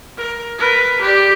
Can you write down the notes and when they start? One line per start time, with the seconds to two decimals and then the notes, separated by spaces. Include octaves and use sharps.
0.18 A#4
0.59 A#4 B4
1.02 G4 D5